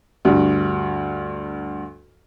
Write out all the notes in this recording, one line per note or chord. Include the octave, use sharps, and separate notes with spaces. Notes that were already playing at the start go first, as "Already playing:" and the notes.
D2 G2